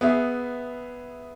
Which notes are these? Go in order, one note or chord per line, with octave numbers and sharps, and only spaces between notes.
B3 G#4 E5